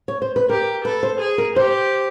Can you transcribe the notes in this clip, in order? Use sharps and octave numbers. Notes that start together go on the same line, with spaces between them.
C#5
C5
B4
G4 A#4
A4 B4
C5
G#4
A#4
G4 C5